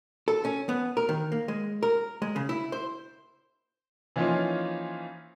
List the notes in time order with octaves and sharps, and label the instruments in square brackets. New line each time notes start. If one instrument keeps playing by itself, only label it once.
[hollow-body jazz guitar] A4
C#4
B3
A#4
D#3
A#3
G#3
A#4
G#3
C#3
E4
C5
[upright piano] E3 F3 A#3 C#4 D#4 F4